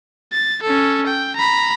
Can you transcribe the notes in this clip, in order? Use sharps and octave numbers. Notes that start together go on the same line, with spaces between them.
A6
C#4 A4
G5
A#5 B5